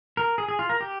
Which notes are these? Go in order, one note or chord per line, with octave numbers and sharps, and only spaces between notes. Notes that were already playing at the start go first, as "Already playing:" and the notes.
A#4
G#4
G#4
F4
A#4
G4